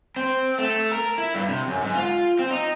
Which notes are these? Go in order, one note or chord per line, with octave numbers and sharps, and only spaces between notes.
C4
A3
A#4
E4
G2
C3
F#2
G#2
F4
C4
D#4